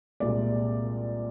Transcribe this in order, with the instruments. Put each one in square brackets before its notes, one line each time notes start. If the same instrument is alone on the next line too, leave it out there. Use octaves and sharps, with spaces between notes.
[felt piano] C2 A#2 G#3 D5